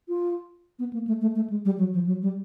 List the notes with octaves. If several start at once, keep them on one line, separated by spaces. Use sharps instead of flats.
F4
B3
A#3
A3
A3
A3
G#3
G3
F#3
F3
F#3
G3